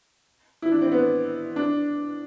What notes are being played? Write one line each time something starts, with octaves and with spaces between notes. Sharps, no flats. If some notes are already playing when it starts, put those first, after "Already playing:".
E4
D4
C4
B3
D4